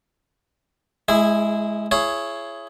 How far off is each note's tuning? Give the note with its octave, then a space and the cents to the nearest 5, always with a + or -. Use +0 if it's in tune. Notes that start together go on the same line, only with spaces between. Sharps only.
G#3 +20 E4 +0 G#4 -20
E4 +30 G#4 +10 C#5 +0